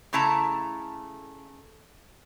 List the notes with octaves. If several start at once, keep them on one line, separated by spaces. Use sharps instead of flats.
C#3 A3 E4 A5 A#5